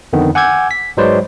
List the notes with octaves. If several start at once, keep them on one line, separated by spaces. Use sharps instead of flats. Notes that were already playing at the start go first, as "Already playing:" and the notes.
F2 D3 D#3 B3
F#5 G#5 D6 E6 G6 G#6
B6
G#2 F#3 G#3 B4 C5 D5